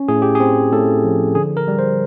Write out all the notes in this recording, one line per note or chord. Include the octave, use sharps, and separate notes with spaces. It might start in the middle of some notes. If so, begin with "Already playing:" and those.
Already playing: C#4
A2 G#4
G4
C4 G#4
A2 A4
F3
D3 G#4
A#4
G3
C5